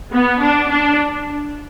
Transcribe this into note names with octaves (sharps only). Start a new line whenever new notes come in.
B3
D4
D4